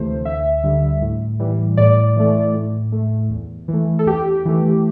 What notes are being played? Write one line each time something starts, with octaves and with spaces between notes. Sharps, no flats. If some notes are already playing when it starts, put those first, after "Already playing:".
Already playing: D2 C3 E3 A3 C5
D2 E5
D3 G3
A2
E3 G3
A2 D5
E3 A3
A2
A3
E2
E3
A3
A4
E2 G4
E3 A3